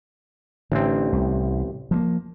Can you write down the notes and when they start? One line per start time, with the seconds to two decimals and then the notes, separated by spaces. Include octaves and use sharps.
0.72 A1 D3 C4
1.12 C2
1.91 F3 G3 A#3